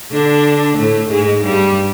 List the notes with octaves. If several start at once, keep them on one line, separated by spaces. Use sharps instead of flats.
D3 D4
A2 A3
G#2 G#3
G2 G3